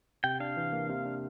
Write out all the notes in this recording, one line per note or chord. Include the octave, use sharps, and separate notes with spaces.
C3 G5
D4 F5
E3
A#3
C3
D4